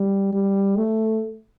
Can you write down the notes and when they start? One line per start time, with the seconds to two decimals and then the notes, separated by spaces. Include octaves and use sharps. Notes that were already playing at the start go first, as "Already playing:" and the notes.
Already playing: G3
0.33 G3
0.77 A3